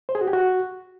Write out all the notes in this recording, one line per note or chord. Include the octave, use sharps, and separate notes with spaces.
C5
G#4
F#4
G4
F#4